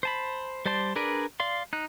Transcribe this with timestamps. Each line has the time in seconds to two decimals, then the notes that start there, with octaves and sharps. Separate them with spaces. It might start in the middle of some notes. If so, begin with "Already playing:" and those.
0.03 C5 A5 B5
0.66 G3 C5 D5 A5 C6
0.96 D4 G#4 A#4 B4 D5
1.40 D5 F5 C6
1.73 D#4 F#6